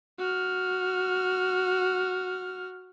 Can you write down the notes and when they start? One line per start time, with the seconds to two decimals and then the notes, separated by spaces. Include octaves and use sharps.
0.18 F#4 F6